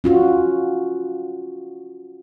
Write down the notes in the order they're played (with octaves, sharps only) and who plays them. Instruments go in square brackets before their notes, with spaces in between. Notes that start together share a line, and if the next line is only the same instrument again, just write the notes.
[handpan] C#4 F4 F#4